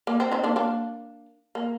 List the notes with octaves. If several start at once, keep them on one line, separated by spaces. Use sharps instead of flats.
A#3
C4
C4 D#4
A#3 D4
A#3 D4
A#3